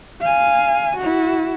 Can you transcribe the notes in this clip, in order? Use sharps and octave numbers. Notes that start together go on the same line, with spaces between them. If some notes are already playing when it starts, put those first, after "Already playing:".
F5 G#5
E4 F#4